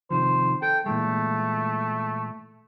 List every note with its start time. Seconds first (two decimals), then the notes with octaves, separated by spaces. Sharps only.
0.11 C3 D#3 F3 C5
0.62 A4 G5
0.86 A#2 E3 G#3 A3